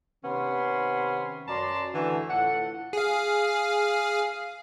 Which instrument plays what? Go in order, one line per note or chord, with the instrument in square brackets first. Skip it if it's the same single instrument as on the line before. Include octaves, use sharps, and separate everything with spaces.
[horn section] C3 D#3 B3 C#4 B5 C6
F#2 F#3 D5 A5 A#5 C6
D3 E3 A3
A2 F4 A4 F#5
[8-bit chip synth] G#4 F5